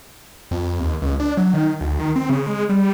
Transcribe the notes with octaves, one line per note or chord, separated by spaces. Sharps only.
F2
D#2
C#2
D4
F#3
D#3
D2
D#3
C4
C#3
G#3
G3